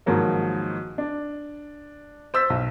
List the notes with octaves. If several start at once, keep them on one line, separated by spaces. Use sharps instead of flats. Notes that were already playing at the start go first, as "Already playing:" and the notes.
G#2 D#3 F3 F#3 A#3
D4
C5 E6 A6 B6
B1